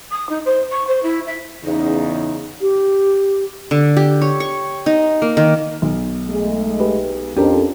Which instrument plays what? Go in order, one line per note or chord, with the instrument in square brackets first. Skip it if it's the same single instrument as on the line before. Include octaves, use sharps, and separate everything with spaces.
[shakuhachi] D#6
D#4
C5
C#6
C5
E4
E5
[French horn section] E2 C#3 [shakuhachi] D#4
[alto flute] G4
[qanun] D3
G4
C#5
C#6
D#4
A#3
D#3
[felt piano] B1
[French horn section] G#3 A3
[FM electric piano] G4 B4
[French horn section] F2 [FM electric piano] C#4 D4 A#4 [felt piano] G4 A4